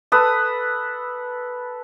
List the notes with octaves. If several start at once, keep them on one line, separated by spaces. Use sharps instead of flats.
A4 B4 D#6